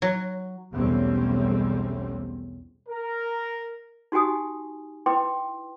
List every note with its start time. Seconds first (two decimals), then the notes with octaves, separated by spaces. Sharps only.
0.02 F#3
0.73 B1 E2 G3 A3 C4 C#4
2.89 A#4
4.12 D#4 F#4 G4 G#5 D#6
5.06 E4 B4 G5 C6 D6